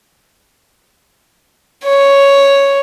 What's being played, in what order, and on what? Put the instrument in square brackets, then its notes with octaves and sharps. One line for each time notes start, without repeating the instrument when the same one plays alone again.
[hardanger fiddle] C#5